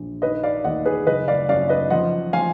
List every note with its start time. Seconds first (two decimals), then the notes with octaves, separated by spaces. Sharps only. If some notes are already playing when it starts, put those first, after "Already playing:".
Already playing: A#1
0.22 D#3 B4 D#5
0.43 D5 F5
0.64 D#2 D#5 F#5
0.86 G#4 B4
1.07 F#1 B4 D#5
1.28 D5 F5
1.49 F#2 D5 F5
1.69 B4 D#5
1.90 F3 D#5 F#5
2.33 F3 F5 G#5